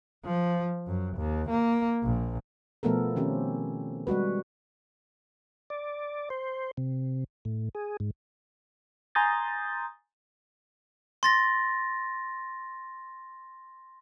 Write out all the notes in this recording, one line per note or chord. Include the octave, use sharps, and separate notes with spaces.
F3
F#2
D#2
A#3
A#1
B2 F3 A3 B3 A4 A#4
D#3 C4 C#4 G4
G3 G#3 F#4 B4
D5
C5
C3
A2
G#4
G#2
G#5 A#5 C6 D#6 G6 A6
C6 A6 A#6